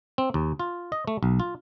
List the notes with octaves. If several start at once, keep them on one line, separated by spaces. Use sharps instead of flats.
C4
D#2
F4
D#5
A3
B1
F4